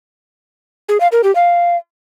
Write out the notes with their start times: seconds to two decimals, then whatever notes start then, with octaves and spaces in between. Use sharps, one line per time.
0.89 G#4
1.00 F5
1.12 A#4
1.24 G4
1.35 F5